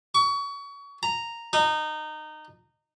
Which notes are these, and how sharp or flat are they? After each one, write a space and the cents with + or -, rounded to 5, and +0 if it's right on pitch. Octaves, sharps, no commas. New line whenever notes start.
C#6 +30
A#5 -5
D#4 -20